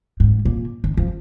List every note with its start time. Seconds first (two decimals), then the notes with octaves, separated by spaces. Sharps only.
0.20 G#2
0.45 A#2
0.84 D#3
0.97 F3